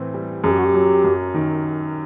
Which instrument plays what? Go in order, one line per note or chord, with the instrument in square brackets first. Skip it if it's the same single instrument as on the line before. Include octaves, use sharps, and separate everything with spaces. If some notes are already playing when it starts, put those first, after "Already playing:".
Already playing: [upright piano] A2 E3 C4
G3
[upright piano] F#2 [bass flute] G#4
[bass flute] G4
F#4
G4
[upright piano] F#3
F#2
D#3